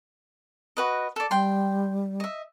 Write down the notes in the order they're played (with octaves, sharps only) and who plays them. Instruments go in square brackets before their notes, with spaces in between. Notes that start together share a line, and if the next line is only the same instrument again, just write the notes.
[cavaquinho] F#4 B4 D#5
A4 D5
[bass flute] G3 [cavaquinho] G5 C6
[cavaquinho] D#5 E5